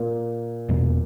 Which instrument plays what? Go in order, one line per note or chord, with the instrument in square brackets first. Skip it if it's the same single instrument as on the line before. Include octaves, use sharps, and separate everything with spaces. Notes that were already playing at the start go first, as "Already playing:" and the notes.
Already playing: [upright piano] A#2
[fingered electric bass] E2 B2 F#3 A#3